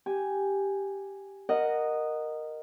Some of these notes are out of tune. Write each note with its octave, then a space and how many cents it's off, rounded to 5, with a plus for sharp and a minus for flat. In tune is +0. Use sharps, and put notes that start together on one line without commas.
G4 +0 G#5 +0
A#4 +0 D#5 -10 F#5 +0